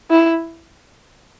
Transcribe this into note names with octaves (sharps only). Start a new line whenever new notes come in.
E4